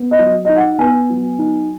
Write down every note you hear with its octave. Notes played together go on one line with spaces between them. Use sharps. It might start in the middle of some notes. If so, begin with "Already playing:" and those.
Already playing: B3
D#5
F#3
D#4 D#5
F#5
B3 G#5
F#3
D#4